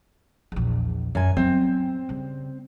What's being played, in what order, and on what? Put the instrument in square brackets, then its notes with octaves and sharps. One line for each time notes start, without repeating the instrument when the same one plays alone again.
[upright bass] A#1 E2
[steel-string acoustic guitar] F#2 G#5
[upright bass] F#3 [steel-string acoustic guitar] C4
[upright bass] C#3 G3